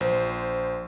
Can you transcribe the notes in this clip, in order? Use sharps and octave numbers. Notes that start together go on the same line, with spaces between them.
A#1 C5